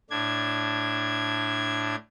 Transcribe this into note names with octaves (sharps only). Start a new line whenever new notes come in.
A2 D4 G#6